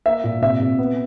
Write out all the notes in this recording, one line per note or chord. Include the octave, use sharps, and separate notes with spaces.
A#3 E5
A#2
C3 E5
C3
B3